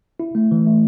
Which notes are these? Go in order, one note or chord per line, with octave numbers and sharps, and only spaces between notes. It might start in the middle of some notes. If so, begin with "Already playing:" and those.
E4
A3
E3
A3